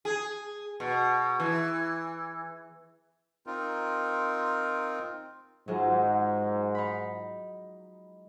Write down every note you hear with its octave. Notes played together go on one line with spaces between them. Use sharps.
G#4
B2
E3
C4 D#4 F4 A#4
G#2 F#3 G#3 F4
D#4 B5